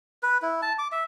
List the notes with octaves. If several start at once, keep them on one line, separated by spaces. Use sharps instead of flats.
B4
E4
A5
D6
E5